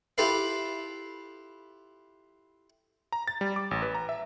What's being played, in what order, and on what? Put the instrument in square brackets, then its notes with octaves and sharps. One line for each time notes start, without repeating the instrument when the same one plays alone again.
[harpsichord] E4 F4 G4 A4 B4 F5
[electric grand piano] A#5
A6
G3
D6
A1
B4
A#5
E5